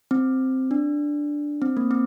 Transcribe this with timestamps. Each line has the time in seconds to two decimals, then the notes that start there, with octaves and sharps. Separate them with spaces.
0.11 C4
0.71 D4
1.62 C4
1.77 A#3
1.91 C4